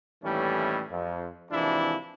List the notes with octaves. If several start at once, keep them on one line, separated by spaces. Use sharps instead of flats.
D#2 A2 E3 G3 A3 C#4
F2
G#1 C3 E3 F3 D4 E4